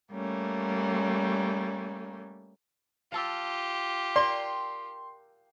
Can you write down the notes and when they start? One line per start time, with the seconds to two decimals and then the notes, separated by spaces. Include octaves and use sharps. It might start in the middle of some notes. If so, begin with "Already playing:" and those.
0.12 G3 A3 A#3 C#4
3.12 F4 G4 F5 A5 E6
4.16 A#4 D5 G5 C6